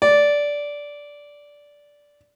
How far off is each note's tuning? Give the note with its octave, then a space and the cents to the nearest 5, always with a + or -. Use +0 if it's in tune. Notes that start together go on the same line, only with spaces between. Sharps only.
D5 -10